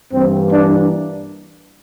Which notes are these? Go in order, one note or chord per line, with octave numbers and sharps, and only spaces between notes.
G2 E3 A#3 C4
D4